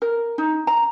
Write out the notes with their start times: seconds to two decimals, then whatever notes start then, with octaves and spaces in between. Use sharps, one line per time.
0.02 A#4
0.38 D#4
0.67 A#5